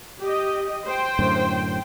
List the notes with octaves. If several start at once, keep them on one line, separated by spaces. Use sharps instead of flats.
G4 D#5
C5 G5
F#2 A2 D3